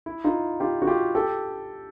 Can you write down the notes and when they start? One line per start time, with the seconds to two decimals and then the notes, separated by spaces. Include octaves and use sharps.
0.06 E4
0.24 D#4 F4
0.60 F4 G4
0.82 F#4
0.87 F4 G4
1.15 G4 A4